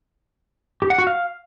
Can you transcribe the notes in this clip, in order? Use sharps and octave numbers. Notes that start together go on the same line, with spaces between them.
G4
F#5
F#4
F5